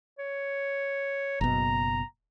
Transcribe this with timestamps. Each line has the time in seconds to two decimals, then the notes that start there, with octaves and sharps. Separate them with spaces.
0.19 C#5
1.41 F#1 B2 A#5